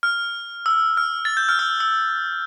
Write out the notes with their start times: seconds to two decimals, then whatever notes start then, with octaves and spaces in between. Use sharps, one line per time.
0.03 F6
0.66 E6
0.97 F6
1.25 A6
1.37 G6
1.49 F6
1.59 E6
1.80 E6